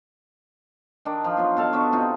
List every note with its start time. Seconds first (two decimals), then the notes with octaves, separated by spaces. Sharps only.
1.05 D#3 D4
1.24 F3
1.37 F#3 B3 F4
1.57 B2 A4 F5
1.73 B3 D4 F#4 C#6
1.93 C3 D#4 F4